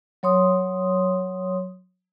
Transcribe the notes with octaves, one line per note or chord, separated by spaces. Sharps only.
F#3 C#5 C6 D#6